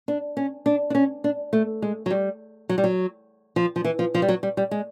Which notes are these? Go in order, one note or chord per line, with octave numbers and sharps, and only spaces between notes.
D4
C#4
D4
D4
C#4
D4
A3
G#3
F#3
G3
F#3
G3
F#3
F3
F3
E3
F3
F3
G3
F#3
G3
G3
G#3